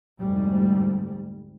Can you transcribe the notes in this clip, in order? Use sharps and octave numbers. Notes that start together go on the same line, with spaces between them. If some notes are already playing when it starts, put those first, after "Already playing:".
F1 D2 G#2 G3